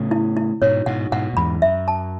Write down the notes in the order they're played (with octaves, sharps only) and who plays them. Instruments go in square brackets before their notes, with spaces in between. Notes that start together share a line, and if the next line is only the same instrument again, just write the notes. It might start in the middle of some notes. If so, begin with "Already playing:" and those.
Already playing: [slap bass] A2 C#3
[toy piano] E4
E4
[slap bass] G#2 B2 [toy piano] C#5
[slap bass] G#2 B2 [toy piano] F#5
[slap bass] G#2 B2 [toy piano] F#5
[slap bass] A2
[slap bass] E2 G#2 [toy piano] B5
[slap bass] F#2 [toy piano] E5
[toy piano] A5